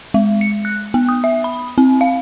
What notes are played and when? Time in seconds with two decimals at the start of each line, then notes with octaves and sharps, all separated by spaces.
0.14 G#3
0.41 C#7
0.65 F#6
0.94 B3
1.09 D#6
1.24 E5
1.44 B5
1.78 C4
2.01 F5